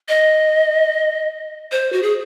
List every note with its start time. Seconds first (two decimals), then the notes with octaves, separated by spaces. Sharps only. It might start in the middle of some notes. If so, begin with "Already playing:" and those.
0.09 D#5
1.72 C5
1.93 F#4
2.03 G#4